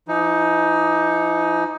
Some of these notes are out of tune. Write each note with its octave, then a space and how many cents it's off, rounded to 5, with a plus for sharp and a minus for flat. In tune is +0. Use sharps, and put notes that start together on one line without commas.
F3 -45 D#4 +15